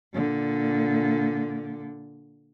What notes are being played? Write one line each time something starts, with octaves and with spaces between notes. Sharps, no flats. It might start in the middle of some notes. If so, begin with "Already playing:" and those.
A#2 D3